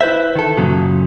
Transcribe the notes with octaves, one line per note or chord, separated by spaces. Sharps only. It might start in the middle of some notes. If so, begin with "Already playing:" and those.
E4 B4 C5 E5
D#3 A4
F#2 A#2 C#3 F#3